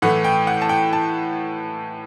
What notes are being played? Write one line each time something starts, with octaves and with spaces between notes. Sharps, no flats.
A2 E3 A3 F#5
G5
F#5
A5
G5
A5